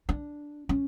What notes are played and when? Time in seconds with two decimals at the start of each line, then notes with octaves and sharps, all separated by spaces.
0.09 D4
0.69 C#4